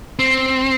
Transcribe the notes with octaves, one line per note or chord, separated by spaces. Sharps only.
C4